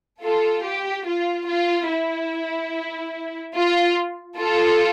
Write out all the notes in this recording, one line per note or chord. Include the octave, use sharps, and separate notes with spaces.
F4 A4
G4
F4
F4
E4
F4
F4 A4